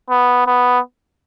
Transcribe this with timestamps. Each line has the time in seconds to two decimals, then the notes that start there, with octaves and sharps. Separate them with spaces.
0.10 B3
0.47 B3